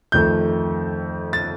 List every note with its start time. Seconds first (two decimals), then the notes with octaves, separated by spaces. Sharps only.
0.12 F2 D#3 A3 G6
1.33 A6